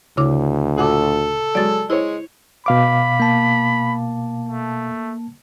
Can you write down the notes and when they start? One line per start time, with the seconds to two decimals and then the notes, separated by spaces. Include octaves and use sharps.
0.17 D2 C#3 E4 D6
0.78 A#2 F#4 A4 F#5 D6
1.55 F#3 G#3 D5 A6
1.90 G#3 E4 C5 C#5
2.66 B2 F5 B5 D6
3.20 A#3 A5
4.49 A3